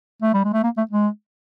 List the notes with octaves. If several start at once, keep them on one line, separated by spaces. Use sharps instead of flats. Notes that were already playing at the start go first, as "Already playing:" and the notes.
A3
G3
G#3
A3
A#3
A3
G#3